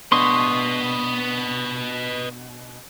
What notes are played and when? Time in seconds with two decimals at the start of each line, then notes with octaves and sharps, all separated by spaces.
0.12 B2 D4 B4 D#5 C6 C#6 D#6